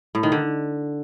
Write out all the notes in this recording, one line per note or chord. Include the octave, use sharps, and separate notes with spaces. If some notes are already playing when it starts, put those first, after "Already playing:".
A2
D#3
D3